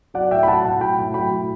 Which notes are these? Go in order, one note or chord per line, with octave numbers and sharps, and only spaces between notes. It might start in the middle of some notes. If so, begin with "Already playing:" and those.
F#3 D5 F#5
A2 E5 G5
B5
F#3 F#5 A5
A2 F#5 A5
F#3 G5 B5
A2
F#3 G5 B5
A2